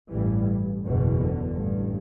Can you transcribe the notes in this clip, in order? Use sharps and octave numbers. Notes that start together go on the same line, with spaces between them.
A1 G2 E3 G3
F#1 E2 B2
D3
A1 G2